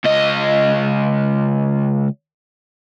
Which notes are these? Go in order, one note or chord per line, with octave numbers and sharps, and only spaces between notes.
C#2 D#5